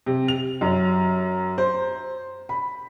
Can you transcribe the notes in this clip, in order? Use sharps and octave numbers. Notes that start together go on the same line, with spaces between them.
C3
F7
F#2
C5
B5